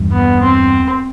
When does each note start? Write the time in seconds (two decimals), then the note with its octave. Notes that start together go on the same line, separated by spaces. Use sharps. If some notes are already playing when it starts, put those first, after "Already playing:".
Already playing: E2 G2
0.12 B3
0.42 C4